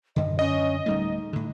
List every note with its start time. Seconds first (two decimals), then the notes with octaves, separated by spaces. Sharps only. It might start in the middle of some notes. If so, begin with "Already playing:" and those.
0.16 F#2 D3 D#5
0.39 C#4 D#5
0.86 D1 G3 A3 D#4
1.33 A2 D3